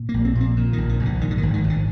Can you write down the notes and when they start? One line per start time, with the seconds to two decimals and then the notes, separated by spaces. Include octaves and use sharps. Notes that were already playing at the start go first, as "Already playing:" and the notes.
Already playing: A#2
0.09 A#3
0.14 A#1
0.25 C4
0.35 A#2 C4
0.57 A#2
0.73 D#3
0.78 A#1
0.89 D#3
1.00 A#1
1.05 D3
1.21 G#2 D#3
1.30 D3
1.38 D#3
1.43 G#1
1.53 D#3
1.64 G#1
1.70 D3